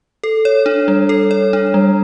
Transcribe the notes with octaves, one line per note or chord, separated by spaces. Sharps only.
A4
C#5
D4
G3
A4
C#5
D4
G3